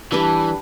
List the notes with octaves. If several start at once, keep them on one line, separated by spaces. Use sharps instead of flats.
E3 G3 D4 G4 B4